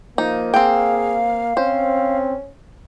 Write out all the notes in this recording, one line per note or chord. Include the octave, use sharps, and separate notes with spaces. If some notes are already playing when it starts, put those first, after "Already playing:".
F3 A#3 D#4
C4 G#4 F5 G5
C4 C#4 C5